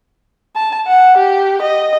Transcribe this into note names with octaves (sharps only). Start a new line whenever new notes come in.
A5
F#5
G4
D#5